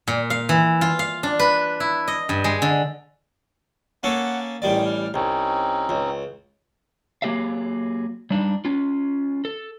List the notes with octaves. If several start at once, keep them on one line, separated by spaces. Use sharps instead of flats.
A#2
F5
E3
F4
F5
D4
B4
E4
D#5
G2
G#3
D3
A#3 C#4 A4 F#5
A1 D#3 G3 D5
F6
C2 C4 C#4 D#4
C#2
F#3 A#3 G4 G#4 E5 F5
G3 D4 D#4
C#4 F4
A4